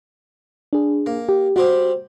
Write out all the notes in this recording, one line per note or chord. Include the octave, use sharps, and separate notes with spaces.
D4 G#4
A#3
G4
G3 C4 F#4 G4